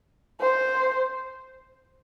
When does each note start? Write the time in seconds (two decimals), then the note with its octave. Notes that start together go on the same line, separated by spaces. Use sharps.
0.41 C5